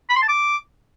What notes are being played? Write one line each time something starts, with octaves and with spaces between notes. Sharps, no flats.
B5
C6
A5
D6